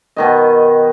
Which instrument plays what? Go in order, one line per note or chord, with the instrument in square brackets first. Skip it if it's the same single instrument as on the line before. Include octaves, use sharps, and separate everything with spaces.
[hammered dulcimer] B2 D#3 D#5